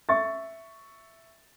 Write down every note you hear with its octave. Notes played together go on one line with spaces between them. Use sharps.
E5 C#6 A6